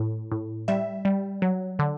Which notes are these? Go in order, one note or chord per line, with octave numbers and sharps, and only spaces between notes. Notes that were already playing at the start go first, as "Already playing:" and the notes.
Already playing: A2
A2
G3 E5
G3
F#3
D3